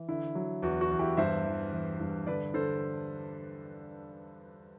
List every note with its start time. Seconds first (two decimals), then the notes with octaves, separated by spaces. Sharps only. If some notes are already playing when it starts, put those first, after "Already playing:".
Already playing: E3
0.08 D3 E4
0.35 F#3
0.63 E2 F#4
0.81 F#4
0.91 E2
0.99 E4 G4
1.17 G2 C5 E5
1.44 E3
1.73 E3
2.00 G2
2.27 D3 B4 D5
2.54 D3 A4 C5